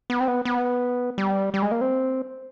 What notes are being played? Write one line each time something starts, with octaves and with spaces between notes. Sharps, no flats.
B3
C4
B3
B3
G3
G3
G#3
A#3
C4